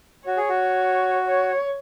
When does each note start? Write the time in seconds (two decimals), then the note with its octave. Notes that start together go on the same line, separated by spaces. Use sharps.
0.26 F#4 C#5
0.37 G#4
0.49 F#4
1.27 C#5